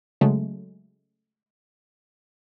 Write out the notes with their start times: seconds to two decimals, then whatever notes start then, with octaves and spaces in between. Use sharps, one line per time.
0.21 C#3 F#3 G#3 A3